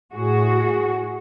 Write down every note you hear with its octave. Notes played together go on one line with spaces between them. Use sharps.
A2 F#4 G#4